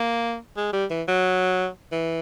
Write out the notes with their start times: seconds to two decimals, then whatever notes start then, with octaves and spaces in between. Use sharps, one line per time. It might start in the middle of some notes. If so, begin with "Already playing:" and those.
Already playing: A#3
0.57 G#3
0.73 G3
0.91 E3
1.08 F#3
1.92 E3